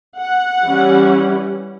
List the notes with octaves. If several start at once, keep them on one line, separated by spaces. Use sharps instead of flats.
F#5
E3 G3 C#4